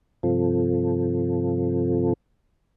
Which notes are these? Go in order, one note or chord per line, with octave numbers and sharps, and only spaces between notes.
G2 C3 F3 C4 F4 A4